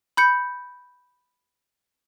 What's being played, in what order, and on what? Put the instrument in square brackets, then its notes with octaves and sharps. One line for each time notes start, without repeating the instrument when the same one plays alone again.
[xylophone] B5 G6 C#7